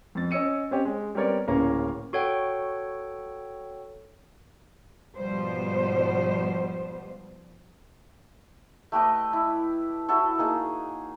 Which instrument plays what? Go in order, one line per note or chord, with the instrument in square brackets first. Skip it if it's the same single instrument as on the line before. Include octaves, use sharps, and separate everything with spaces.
[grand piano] F2 A6
C#4 D#5 E6 C#7 D#7
C4 C#4 G4 D#5
G#3
G3 B3 C4 A#4 C#5 D5
D1 C#3 A#3 C#4 F5 A#5
[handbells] F#4 A4 C#5 F#5 G5
[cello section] G#2 B2 F3 G3 B3 C5
[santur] A3 G4 B4 D#5
E4
E4 F#4 A4 C#5
A#3 D#4 G#4